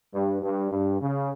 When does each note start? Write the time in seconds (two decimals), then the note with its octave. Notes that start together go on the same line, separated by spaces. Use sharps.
0.13 G2
0.42 G2
0.71 G2
1.00 C#3